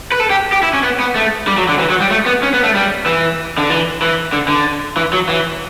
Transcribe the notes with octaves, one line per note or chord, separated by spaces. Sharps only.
B4
A4
G4
G4
E4
C#4
B3
B3
A3
G3
F#3
D3
E3
F#3
G3
A3
B3
C#4
B3
A3
G3
E3
D3
E3
E3
D3
D3
E3
F#3
E3